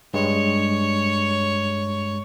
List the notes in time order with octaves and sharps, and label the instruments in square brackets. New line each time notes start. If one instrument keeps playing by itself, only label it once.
[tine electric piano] G2 G#3 [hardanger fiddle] C#5